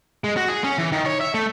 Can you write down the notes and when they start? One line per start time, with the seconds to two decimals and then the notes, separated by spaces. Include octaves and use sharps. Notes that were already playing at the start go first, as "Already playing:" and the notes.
0.24 G#3
0.37 F#4
0.48 G#4
0.64 C#4
0.78 E3
0.92 D#3
1.06 C#5
1.21 E5
1.34 A3